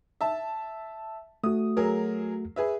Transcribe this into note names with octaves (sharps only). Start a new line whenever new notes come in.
E5 A5
A3 F#4 D#6
F#3 G#4 A#4
G#4 B4 E5